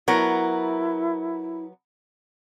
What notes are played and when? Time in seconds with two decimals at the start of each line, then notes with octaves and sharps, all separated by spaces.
0.08 F#3 B3 E4 A#4